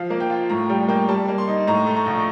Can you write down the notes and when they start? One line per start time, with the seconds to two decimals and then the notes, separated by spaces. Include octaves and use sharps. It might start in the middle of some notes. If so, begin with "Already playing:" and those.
Already playing: F3 F5
0.10 A#3
0.20 G5
0.30 F4
0.49 A2 A#5
0.69 G3 G5
0.88 A#3 G5
1.08 G3 A5
1.28 A#3
1.38 C6
1.47 D#4
1.67 A2 A#5
1.86 A3
1.96 A#5
2.06 A#1